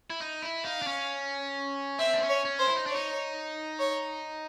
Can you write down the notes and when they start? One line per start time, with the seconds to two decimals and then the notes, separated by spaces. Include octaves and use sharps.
0.10 E4
0.21 D#4
0.42 E4
0.65 D#4 F5
0.82 D4
0.87 C#4
1.99 C4 E5
2.13 D4
2.22 C#4
2.29 C#5
2.45 C#4
2.59 C5
2.67 E4
2.76 D#4
2.86 D4 C#5
2.96 D#4
3.79 C#5